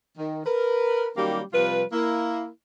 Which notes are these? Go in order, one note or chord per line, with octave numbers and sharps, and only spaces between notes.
D#3
A#4 B4
D#3 F#3 G3 A#3 C#4 G4
C3 F3 G3 F4 B4
A#3 E4